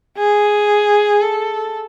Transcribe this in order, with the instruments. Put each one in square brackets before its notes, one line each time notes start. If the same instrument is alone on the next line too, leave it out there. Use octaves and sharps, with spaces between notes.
[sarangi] G#4
A4